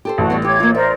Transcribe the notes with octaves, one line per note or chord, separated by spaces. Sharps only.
G4 A4 C5
A1 F#4 A5
G3 B3
G4 C#5 D6 G#6
A#3 F4
A#4 C5 D5 E5